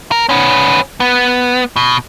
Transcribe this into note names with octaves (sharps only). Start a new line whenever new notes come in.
A#4
B3 C#4
B3
B2